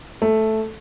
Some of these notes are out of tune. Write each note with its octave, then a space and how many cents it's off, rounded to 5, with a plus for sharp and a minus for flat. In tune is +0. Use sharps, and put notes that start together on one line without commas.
A3 -5